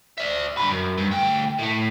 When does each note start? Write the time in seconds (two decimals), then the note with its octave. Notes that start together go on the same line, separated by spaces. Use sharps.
0.18 D5 E5
0.57 D3 B4
0.70 F#2
0.97 G2
1.11 D2 G5
1.59 A2 A3